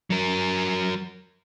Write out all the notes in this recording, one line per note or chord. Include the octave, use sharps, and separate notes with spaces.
F#3 A#4